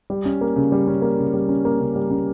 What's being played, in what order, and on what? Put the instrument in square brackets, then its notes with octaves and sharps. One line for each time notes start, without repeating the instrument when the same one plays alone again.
[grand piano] G3
C#4
A#3
C#3
G3
C#4
A#3
C#3
G3
C#4
A#3
C#3
G3
C#4